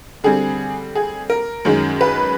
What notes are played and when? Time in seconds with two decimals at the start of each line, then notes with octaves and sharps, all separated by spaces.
0.24 D3 G3 C4 G#4
0.95 G#4
1.30 A#4
1.65 F#2 D#3 G#3 C#4
2.01 B4